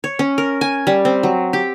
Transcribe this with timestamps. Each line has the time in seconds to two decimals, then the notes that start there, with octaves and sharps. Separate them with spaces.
0.04 C#5
0.19 C#4
0.38 A#4
0.61 G#5
0.87 G3
1.05 C4
1.23 F#3
1.53 G4